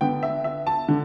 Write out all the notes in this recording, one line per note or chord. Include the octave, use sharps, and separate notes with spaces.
D3 B3 G5
E5
E5
A5
D3